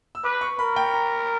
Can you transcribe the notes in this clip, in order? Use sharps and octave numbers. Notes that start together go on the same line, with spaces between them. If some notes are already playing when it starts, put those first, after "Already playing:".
E6
B4 D6
C#6
A#4 B5
G5
A#5